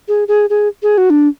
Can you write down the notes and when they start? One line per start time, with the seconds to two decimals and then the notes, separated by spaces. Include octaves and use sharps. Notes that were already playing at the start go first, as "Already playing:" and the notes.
0.08 G#4
0.28 G#4
0.50 G#4
0.83 G#4
0.98 F#4
1.10 D4